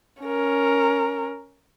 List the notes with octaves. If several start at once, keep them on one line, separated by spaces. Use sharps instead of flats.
C#4 A#4